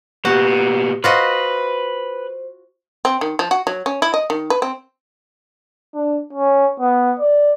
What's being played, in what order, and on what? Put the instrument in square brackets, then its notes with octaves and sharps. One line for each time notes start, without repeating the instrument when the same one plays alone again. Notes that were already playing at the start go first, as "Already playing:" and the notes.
[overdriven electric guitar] A#2 B3 [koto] F#4 [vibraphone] G4
[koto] F4 F#4 D#5 [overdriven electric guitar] B4 [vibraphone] C5
[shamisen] C4
D#3
F3
F#4
F#3
C#4
E4
D#5
D#3
B4
C4
[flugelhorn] D4
C#4
B3
D5